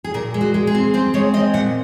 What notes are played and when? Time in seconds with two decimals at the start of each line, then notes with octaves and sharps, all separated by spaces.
0.04 G#4
0.14 A#2 A#4
0.34 G#3
0.41 F#4
0.54 G#3
0.67 G#4
0.75 C4
0.94 C4 C5
1.14 G#3 C#5
1.34 C4 D#5
1.54 A#2 F#5